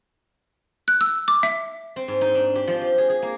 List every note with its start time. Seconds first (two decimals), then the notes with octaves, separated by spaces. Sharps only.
0.88 F#6
1.01 E6
1.28 D6
1.43 E5
1.96 C4
2.08 G#2
2.21 D#4
2.35 D4
2.55 G4
2.67 F3
2.81 G4
2.98 G#4
3.09 G#4
3.22 A#3